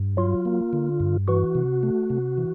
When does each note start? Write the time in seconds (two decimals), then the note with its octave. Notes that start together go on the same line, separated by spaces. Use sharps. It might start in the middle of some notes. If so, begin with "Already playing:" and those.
Already playing: G2
0.17 F#3 F4
0.45 A#3
0.73 D3
1.00 G2
1.28 E3 F#4
1.55 C3
1.83 A3
2.10 C3
2.38 E3